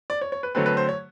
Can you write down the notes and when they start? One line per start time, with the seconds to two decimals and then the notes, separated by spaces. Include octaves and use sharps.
0.10 D5
0.21 C#5
0.32 C#5
0.43 B4
0.55 D3 F#3 A3 C4 B4
0.66 B4
0.77 C5
0.89 C#5